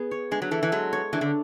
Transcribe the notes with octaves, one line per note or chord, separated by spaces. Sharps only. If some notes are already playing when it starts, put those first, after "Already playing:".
Already playing: B3 G#4
C#5
G#3 D4
F#3
E3 A4
E3
F#3 G#3
C#5
E3 D4
D3